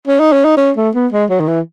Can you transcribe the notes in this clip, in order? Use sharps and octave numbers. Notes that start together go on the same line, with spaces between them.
C#4
D#4
C#4
D#4
C#4
A3
B3
G#3
F#3
D#3
E3